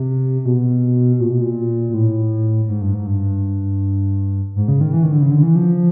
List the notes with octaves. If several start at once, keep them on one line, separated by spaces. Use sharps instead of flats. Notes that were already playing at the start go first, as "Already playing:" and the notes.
Already playing: C3
B2
A#2
B2
A#2
A#2
A2
G#2
G2
G#2
G2
G#2
C#3
D#3
E3
D#3
D3
C#3
D3
E3
F3